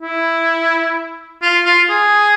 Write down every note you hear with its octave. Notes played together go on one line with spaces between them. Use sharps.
E4
F4
F4
G#4